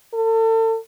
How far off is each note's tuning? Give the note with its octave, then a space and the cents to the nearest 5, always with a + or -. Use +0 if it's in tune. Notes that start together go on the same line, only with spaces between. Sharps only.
A4 +35